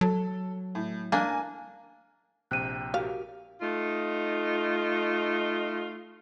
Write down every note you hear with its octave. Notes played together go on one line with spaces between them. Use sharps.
F#3 A4
A2
A#3 D4 G#5
A#1 C3 G5 F#6 D#7
F#4 G4 A#4 F5
A3 D#4 F4